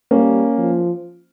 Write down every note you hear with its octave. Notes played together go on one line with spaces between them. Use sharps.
G3 A#3 C#4
F3